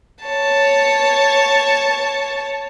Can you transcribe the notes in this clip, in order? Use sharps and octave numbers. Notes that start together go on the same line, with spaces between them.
C#5 A5